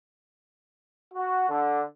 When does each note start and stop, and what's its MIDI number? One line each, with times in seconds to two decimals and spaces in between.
1.14 1.46 66
1.50 1.81 50